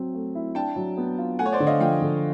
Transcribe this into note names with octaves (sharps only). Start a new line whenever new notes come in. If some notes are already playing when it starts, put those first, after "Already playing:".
Already playing: F#3 C4
A3
E4
D4 G5 A5
F#3
B3
F4
A3 F#5 G#5
C#5
C5 D5
D3
D#5 F5
F3 F5 G5
D3